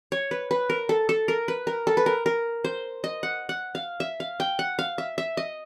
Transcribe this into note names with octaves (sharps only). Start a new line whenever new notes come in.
C#5
B4
B4
A#4
A4
A4
A#4
B4
A#4
A4
B4
A#4
A#4
C5
D#5
F#5
F#5
F5
E5
F5
G5
F#5
F5
E5
E5
D#5